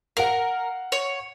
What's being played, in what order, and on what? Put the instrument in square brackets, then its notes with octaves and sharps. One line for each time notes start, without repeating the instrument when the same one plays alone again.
[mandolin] A#4 [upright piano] F5 F#5
[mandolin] C#5